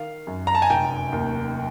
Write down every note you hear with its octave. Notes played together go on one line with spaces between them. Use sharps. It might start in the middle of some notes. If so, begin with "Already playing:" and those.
Already playing: D#3 F5
F#2
A#5
A5
G#5
F1 G5
D#2